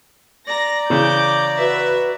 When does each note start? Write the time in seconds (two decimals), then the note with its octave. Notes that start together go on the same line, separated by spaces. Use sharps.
0.47 D5 A#5 A#6
0.90 C#3 E3 D6 G6
1.58 F#4 B4 E5